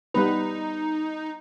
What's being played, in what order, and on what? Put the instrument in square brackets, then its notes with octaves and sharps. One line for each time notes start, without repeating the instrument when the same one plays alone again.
[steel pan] G3 B3 B4 [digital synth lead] D#4